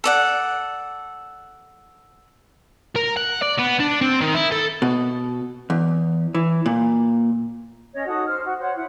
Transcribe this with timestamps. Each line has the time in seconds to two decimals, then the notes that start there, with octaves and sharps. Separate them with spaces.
0.04 A4 D5 F#5
2.96 A#4
3.17 F#5
3.42 D5
3.58 B3
3.80 D4
4.01 C4
4.21 D#3
4.35 E4
4.52 A4
4.82 B2
5.70 E2
6.35 E3
6.66 A#2
7.93 C#4 C#5 D#5
8.07 D#4 F#4 A4 D#6
8.26 C5 F6
8.44 F#4
8.59 C5 C#5 F#5
8.74 E4 F#5